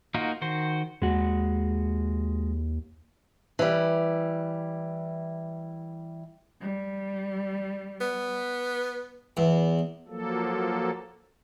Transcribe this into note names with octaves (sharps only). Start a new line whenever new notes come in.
A#3 D#4 F4 F#4 A#4
D#3 F#4 C5
D#2 G#3 F#4
E3 G3
G3
B3
E2
F3 F#3 A#3 A4